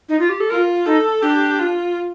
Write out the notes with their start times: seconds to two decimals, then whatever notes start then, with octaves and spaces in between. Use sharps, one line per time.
0.09 D#4
0.20 F4
0.29 G4
0.40 A4
0.50 F4 A#4
0.86 D#4 A4
1.22 D4 G4
1.59 F4